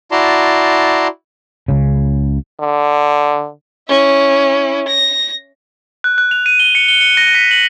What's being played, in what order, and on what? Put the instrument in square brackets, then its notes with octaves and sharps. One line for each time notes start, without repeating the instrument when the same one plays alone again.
[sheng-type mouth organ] E4 F#4 D5 A5 A#5 C6
[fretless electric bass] C#2 C#3
[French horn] D3
[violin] C#4 E4
A#6
[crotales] F#6
F#6
F7
D#7
G7
C#7
G7
C#7
A#6
B6
F#7